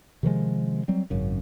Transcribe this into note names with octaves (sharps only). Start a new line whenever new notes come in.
C3 D#3 F3 G#3
F#3 G3 C4
G#1 F#2 C#3